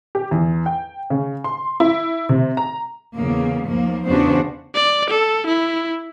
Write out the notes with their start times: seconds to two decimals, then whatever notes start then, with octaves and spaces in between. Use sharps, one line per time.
0.15 G4
0.31 E2
0.66 G5
1.10 C#3
1.44 C6
1.80 E4
2.29 C3
2.57 A#5
3.16 E2 C#3 A#3
3.67 D#2 F3 A#3
4.06 E2 C#3 B3 D4 F#4 C5
4.75 D5
5.10 A4
5.47 E4